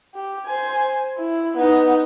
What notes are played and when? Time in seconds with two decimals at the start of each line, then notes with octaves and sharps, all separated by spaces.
0.14 G4
0.46 C5 G#5
1.19 E4
1.57 B3 D#4